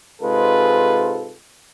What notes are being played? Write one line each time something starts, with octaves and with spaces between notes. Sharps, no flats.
G#2 C3 G#3 F4 A4 B4